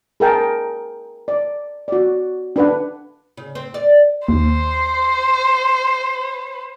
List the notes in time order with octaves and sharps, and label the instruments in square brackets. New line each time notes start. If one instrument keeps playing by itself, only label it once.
[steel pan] G#4 A#4 G5 A5
D5
F#4 D5
D4 B4 F#5
[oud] C#3
C4
D5
[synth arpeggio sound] D#2 [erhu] C5